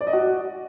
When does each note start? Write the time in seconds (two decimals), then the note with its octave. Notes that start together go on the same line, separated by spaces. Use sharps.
0.01 D5
0.07 D#5
0.13 F#4